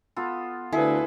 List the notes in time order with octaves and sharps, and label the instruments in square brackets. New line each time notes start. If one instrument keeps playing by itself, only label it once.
[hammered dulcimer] B3 F4 A4
[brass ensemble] D2 [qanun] E4 [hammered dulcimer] G#4 [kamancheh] A4 B4